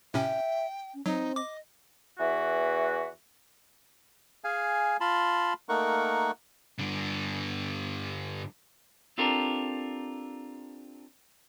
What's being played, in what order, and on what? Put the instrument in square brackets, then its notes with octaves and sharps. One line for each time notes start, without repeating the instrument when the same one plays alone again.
[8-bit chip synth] A2 C3 C#4 [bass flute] E5 [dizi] G5
[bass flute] C#4
[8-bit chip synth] F#3 [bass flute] C4 [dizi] D#4
[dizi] D#5 [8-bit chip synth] D6
[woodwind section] E2 E3 F#4 E5
[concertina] G#4 F5 G#5
F4 A5 B5 C6
A3 A#3 D#4 A#4 F#5 C#6
[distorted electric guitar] G2 D3
[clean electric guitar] C4 D4 F4 G4 A4 A#4